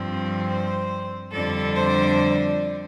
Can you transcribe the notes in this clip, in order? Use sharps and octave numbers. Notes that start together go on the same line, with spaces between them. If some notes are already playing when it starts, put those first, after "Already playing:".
Already playing: G2 F3 C4
C5
F2 D3 G3 D4 A4
C5